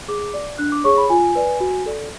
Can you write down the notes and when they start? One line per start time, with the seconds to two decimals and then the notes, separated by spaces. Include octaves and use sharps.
0.08 G#4 D6
0.34 D5
0.58 D4 F#6
0.72 D6
0.84 G#4 C#5 C#6
0.98 B5
1.10 F4 G#5
1.35 B4 D5
1.60 F#4
1.86 A4 D5